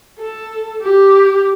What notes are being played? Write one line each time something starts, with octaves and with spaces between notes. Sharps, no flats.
A4
G4